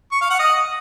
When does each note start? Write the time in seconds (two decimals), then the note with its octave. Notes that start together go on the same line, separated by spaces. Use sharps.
0.12 C#6
0.21 F5
0.30 F#5
0.39 D#5